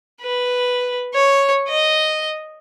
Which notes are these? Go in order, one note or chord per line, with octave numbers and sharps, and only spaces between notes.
B4
C#5
D#5